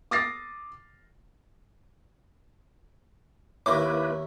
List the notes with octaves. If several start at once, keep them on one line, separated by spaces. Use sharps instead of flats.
D6 D#6 A6 A#6 C7
D#2 A#3 E4 A#4 B4 C#5 E5 D6